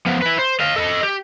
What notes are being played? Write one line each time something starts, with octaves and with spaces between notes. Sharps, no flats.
F3 B3
E4 B4
C5
D#5 F5
A4 D#5
G4